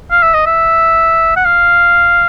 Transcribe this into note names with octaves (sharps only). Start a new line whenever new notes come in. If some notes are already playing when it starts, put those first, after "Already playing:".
F5
E5
D#5
E5
F#5
F5